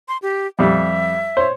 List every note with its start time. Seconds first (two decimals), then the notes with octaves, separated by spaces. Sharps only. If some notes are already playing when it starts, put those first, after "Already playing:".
0.08 C6
0.22 G4
0.59 F2 G3 E5
1.37 C5 C#5